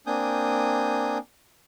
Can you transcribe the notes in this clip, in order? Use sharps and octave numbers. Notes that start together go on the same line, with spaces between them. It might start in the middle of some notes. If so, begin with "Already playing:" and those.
A#3 C4 D4 G#5 D#6 G6